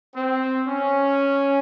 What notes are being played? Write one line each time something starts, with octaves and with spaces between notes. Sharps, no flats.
C4
C#4